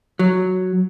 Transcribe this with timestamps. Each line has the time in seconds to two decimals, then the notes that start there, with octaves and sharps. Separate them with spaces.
0.19 F#3